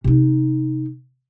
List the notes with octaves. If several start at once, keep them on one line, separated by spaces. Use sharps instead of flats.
C3 D#4